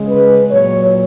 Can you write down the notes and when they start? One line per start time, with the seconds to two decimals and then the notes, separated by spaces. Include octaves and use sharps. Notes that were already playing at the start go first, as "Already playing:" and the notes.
Already playing: C#3 G#3
0.10 B4
0.52 A#2 F#3 C#5